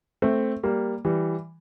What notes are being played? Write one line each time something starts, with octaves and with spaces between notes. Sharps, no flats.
A3 C4
G3 A#3
E3 G3